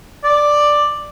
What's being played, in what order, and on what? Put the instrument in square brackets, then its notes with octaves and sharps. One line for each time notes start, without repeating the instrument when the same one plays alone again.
[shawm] D5